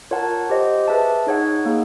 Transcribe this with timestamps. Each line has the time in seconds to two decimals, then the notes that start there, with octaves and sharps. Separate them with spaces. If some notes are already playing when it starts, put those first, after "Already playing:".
0.11 F4 A#4 C#5 F#5 A5
0.50 G4 C5 D#5
0.88 G#4 B4 E5 A5
1.27 D#4 G#4 C#5 F#5
1.66 A#3 D#4 G#4